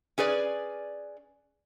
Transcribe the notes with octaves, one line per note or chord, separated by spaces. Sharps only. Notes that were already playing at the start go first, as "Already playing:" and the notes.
C#4 G#4 B4 D5